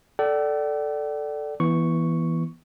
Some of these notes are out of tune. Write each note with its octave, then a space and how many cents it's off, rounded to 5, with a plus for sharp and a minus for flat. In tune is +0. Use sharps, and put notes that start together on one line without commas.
A4 +0 D5 +0 G5 -45
E3 +0 B3 -35 C#6 +0